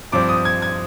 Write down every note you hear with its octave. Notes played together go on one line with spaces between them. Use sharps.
G2 F3 C4 D6
D#6
G#6
G#6